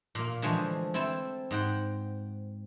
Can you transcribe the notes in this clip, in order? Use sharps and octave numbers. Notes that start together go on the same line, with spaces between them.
A#2 A#3
D3 E3 F3 G#3 A3
C4 E4 A4
G#2 F#5 G5